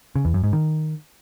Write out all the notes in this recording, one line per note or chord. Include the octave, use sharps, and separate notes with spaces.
C#3
E2
F#2
G#2
D#3